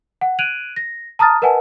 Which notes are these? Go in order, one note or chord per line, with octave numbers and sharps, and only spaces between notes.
F#5
F#6 G#6 D7 D#7 F7 F#7
A#6
A5 A#5 D#6 F6 A6
A#4 B4 D#5 F#5 G#5 A5